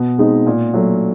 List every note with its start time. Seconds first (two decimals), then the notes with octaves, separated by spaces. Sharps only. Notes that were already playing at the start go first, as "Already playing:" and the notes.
Already playing: B2
0.18 G#3 C4 D#4
0.46 A#2
0.74 F#3 A3